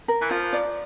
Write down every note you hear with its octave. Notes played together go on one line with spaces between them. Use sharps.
A#4
E3
F3 F4
D5